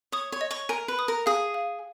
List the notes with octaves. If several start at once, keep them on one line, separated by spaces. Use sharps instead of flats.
C#5 D#6
C#5
D#5
C#5
A#4 G#5
B4
D#6
A#4
G#4 F5
F5